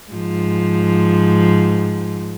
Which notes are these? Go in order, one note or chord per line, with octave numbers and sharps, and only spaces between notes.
G#2 F3